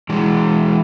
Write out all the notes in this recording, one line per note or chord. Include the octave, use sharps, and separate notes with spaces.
E3 G#3